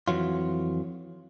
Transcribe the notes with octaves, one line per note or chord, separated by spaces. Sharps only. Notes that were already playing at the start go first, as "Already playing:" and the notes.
F2 A2 E3 F#3 F4